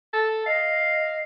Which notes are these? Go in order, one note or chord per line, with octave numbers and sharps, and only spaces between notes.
A4
D#5 F5